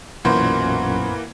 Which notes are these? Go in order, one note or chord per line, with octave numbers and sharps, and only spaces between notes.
B1 F#2 A#2 E3 A#3 B3 F#4 C5